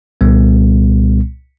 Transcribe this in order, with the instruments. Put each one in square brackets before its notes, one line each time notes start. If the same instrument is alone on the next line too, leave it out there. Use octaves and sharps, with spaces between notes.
[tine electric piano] C2 A#2 G3 B3